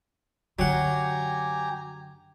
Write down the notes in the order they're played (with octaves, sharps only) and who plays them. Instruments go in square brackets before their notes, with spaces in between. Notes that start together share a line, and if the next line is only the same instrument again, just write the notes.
[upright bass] F#2 D3 [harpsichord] F#3 F#5 [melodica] G4 G#5 A#5